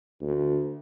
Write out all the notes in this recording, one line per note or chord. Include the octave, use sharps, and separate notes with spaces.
D2